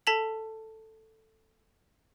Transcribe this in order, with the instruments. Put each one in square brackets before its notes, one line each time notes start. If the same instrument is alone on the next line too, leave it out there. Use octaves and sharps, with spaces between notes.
[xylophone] A4 A5 B6 F7 F#7